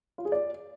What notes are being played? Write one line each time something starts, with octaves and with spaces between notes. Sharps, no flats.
F4
G#4
D5